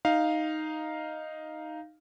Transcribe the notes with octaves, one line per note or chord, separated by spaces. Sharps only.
D#4 F5